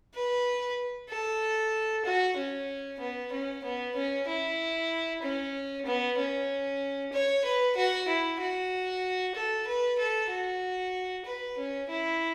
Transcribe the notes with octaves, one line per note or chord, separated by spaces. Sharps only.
B4
A4
F#4
C#4
B3
C#4
B3
C#4
E4
C#4
B3
C#4
C#5
B4
F#4
E4
F#4
A4
B4
A4
F#4
B4
C#4
E4